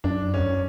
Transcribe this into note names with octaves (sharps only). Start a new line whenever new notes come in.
F#2 D4
C#4
F#2